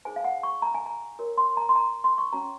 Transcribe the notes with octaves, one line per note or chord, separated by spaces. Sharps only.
D#4 G#4 C5 G#5
F5
F#5
C#6
A#5
G#5
A#5
F#4 A#4 C#5
C6
A#5
C6
A#5
C6
C#6
C#4 F#4 C#5 A#5